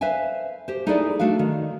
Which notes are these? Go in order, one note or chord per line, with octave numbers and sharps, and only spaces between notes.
B4 C5 E5 F5 G#5
G4 C5
D#4 E4 G#4 A4 B4 D5
A3 D4 F#4 F5
D#3